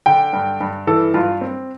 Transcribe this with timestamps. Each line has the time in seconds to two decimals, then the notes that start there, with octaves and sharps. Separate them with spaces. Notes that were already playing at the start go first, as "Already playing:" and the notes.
0.06 D3 G5
0.33 G2
0.61 G2
0.87 E3 A4
1.14 G2 F4
1.41 C4